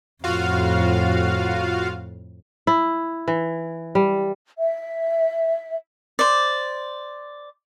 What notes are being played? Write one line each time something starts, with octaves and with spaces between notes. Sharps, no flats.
F2 A2 F4 F#4 F5
E4
E3
G3
E5
C5 D5